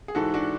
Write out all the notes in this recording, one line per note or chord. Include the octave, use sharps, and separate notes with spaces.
G#4
G#2 E3 F#4 A4
D4 F#4